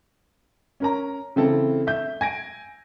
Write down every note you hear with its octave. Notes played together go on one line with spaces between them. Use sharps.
C#4 A#4 A#5
C#3 E3 C4 E4 A4
E5 G6
G#5 A#6 D7